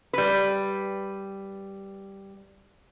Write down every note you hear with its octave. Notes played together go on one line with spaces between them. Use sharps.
G3 B4